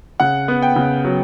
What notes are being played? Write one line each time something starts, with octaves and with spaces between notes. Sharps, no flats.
C#3 F#5
B3
G5
C#3
F#3